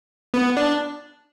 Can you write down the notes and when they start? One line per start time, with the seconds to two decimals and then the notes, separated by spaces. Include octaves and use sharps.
0.34 B3
0.57 D4